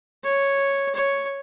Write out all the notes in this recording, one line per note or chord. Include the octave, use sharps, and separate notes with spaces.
C#5
C#5